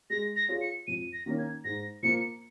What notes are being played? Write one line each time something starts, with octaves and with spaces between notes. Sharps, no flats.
G#3 A#6
A#6
F4 G#4 C#5
C#7
F2 D#7
A#6
D#3 A#3 C#4
G#6
G#2 A#6
F3 A#3 C#7